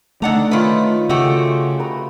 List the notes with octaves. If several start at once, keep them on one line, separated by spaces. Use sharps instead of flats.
D3 A3 D4 D#4 F#5 A#5
D#3 F4 B4 C#5 E5
C#3 A3 F#4 G4
B4 A#5 D#6